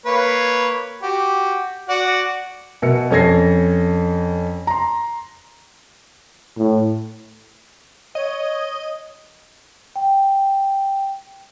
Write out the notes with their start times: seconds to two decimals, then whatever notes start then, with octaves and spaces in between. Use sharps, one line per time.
0.06 A#3 B4 C#5
1.03 F#4 G4
1.89 F#4 D5 F#5
2.82 B2 A#4 E5 C#7
3.11 F2 C#4 A4 G#6 A#6 C7
4.67 A#5 C6
6.57 A2
8.15 C#5 D#5
9.96 G5